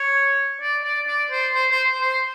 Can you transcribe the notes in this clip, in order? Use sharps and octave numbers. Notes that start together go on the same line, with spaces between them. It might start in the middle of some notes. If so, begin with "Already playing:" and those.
Already playing: C#5
D5
D5
D5
C5
C5
C5
C5